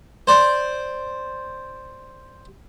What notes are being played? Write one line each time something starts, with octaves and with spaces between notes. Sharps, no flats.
C5 D5